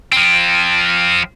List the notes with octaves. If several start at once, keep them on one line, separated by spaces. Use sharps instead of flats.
F3 C4